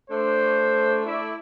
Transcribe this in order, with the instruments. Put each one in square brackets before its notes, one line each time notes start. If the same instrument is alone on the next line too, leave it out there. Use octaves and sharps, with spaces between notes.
[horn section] A3 D4 [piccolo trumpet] C5
[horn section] A3 D5 E5 [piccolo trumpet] E4